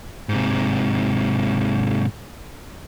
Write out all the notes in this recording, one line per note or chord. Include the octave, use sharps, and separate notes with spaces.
G#2 C3